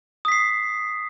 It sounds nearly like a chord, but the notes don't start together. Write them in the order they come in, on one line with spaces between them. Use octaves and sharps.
D#6 B6 C7